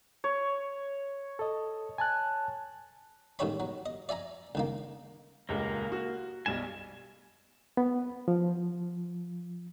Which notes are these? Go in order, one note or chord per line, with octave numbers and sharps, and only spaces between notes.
C#5
A4 D#5
G#5 A5 F#6
A1 G#2 D#3 G4 C#5 B5
F#3
D#5
D5 E5 G#5 A#5
C#2 D#3 A#3
D#1 C#2 A#3
F#4
B1 G3 F4 G#5 E7
B3
F3